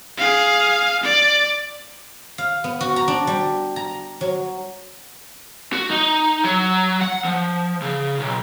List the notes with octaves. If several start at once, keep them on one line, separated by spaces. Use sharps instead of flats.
G#4 F5
D5
F5
B3
F#4
A#5
D4
G3
A#5
F#3
F#4
D#4
F#3
F#5
F3
C#3
B1